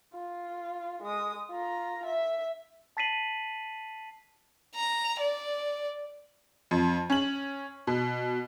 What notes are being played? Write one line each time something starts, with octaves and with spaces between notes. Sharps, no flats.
F4
G#3 D#6
F4 A#5
E5
A5 A6 B6 C7 D#7 F#7
A#5
D5
F2
C#4 F#7
B2